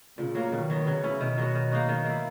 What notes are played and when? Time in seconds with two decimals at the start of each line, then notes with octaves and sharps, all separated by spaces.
0.18 A#2 C#3
0.35 F#3 A#3
0.52 B2 D#3
0.70 F#3 B3
0.87 C#3 F#3
1.04 C#4 E4
1.20 B2 D#3
1.38 F#3 B3 F#4
1.55 D#3
1.72 A#3 D#4 F#4
1.89 D#3
2.05 A#3 E4